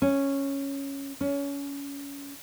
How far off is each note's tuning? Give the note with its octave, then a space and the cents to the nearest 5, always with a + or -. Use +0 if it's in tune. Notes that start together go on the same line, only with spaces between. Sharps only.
C#4 -5
C#4 +25